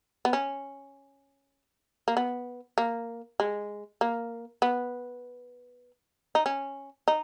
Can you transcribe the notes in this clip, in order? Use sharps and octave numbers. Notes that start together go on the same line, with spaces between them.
B3
C#4
A#3
B3
A#3
G#3
A#3
B3
D#4
C#4
D#4